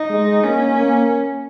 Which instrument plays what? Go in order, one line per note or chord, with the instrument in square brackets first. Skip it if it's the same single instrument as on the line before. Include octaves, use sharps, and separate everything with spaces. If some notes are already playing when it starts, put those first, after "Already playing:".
Already playing: [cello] D#4
[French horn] G#3
[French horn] A#3 [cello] C#4
[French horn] A#3